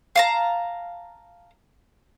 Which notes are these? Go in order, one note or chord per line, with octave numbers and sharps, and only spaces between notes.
F5 A5 A#5